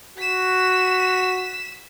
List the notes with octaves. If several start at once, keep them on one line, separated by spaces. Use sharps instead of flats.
F#4 B6 E7